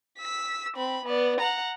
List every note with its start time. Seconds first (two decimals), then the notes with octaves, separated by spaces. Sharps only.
0.19 E6 B6
0.77 C4 B5
1.05 B3 D5
1.40 F#5 A#5